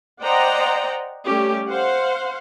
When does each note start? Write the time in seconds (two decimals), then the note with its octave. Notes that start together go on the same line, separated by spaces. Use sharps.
0.22 C5 D5 D#5 F#5 G5 A#5
1.25 G3 A3 C#4 G4
1.68 C5 F5 F#5